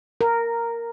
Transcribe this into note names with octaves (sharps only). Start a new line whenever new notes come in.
A#4